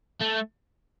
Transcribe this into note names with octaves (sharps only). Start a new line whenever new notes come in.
A3